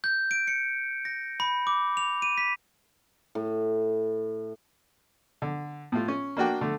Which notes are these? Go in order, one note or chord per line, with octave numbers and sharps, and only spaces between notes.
G6
D7
C#7
A#6
B5
D6
F7
D#7
B6
A2
D3
A2 F4
C#4
A#3 D4 F#4 G5
D3 A3